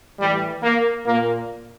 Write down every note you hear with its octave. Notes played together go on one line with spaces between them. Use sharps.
A2 E3 G3
A#3
A#2 A#3